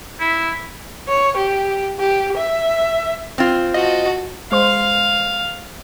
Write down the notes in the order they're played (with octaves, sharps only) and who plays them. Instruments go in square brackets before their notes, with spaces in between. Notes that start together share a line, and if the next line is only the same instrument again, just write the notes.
[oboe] E4
[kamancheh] C#5
G4
G4
E5
[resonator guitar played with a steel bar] C4 F4
[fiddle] F#4 A5 [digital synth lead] D#5
[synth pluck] G#3 C5 C6 [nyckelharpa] F5